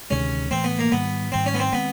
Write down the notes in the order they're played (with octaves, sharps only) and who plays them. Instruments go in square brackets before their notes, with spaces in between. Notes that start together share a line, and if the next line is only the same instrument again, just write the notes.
[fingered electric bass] D2 C3 D#3 G#3 [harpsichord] C#4
[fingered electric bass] A2 E3 A3 [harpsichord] C4
[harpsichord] B3
A#3
[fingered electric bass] G#2 D#3 G3 [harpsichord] B3
[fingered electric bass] G#2 D#3 G3 [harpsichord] C4
[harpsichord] C#4
B3
C4
[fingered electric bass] D#3 G#3 C4 [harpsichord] B3